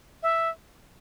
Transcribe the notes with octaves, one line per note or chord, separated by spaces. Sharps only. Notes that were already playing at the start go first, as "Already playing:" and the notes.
E5